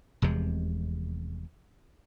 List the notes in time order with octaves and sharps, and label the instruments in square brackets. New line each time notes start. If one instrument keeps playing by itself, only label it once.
[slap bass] F1 E2 C3 G#3